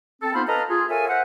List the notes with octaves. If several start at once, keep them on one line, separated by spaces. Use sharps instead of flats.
C4 A4
B3 D#4 F4 C5 F5 B5
A4 B4 D#5 F5 A5 A#5
F4 G#4
A4 A#4 C#5 E5 F5 G#5
A#4 C5 E5 F#5